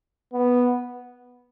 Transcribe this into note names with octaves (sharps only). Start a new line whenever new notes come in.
B3